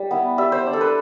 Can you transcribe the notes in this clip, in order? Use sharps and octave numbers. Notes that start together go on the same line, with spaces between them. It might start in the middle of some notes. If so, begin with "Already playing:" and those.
Already playing: G3
B3 E4
G3 E5
C5
D4
A4
B4